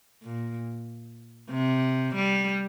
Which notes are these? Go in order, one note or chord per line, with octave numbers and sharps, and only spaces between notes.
A#2
C3
G3